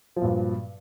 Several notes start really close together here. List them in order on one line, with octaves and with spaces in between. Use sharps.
F3 F#3 A#2 G2